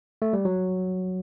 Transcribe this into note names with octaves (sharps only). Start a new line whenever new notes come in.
A3
G3
F#3